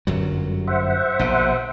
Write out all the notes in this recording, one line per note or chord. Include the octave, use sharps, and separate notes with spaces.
G1 F#2 F#3
C5 E5 F#5
A#1 B2